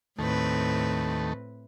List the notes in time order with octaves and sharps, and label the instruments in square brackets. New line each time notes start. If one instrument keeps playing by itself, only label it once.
[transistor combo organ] D#2 A3 [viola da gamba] A2 C4 B4